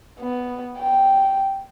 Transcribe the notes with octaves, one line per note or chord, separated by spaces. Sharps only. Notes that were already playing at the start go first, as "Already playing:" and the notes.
B3
G5